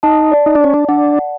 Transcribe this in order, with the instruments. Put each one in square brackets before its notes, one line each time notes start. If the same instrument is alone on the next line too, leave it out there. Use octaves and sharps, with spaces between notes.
[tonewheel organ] D#4 [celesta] A5
[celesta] D5
[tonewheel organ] D#4
D4
[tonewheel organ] C#4 [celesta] D5
[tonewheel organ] D4
[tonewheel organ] D4 [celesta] F#5
[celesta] F#5